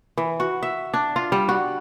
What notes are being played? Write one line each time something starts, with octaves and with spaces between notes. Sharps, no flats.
E3
F#4
E5
D4
F4
G3
F#4